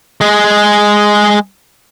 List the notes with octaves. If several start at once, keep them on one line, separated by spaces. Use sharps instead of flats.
G#3 G#4